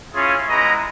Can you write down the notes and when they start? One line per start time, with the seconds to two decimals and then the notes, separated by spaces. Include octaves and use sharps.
0.14 C#4 E4 F4 G#4
0.49 G#3 B3 E4 D#5 A#5